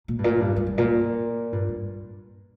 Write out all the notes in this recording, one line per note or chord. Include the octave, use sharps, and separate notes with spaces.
A#2
G2
A#2
G2
G2
G2
A#2
G2
G2